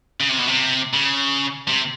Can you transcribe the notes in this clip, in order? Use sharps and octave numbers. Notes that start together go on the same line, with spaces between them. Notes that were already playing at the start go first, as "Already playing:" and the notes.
C#3
C3
B2
C3
C#3
C3